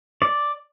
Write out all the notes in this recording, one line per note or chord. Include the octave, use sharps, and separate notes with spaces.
D5